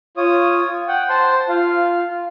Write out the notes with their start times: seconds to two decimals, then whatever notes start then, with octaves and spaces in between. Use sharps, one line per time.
0.17 F4 C#5 D#6
0.88 F#5 G5
1.09 C5 A5 C6
1.49 F4 F5